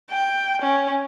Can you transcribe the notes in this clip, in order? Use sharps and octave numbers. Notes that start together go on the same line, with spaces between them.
G5
C#4